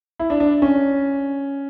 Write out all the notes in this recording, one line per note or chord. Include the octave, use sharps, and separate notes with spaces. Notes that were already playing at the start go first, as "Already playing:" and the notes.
E4
D4
D4
C#4